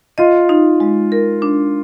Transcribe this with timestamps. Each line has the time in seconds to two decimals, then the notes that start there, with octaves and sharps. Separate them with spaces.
0.18 F4 D#5
0.49 D#4
0.80 G#3
1.12 A#4
1.42 D4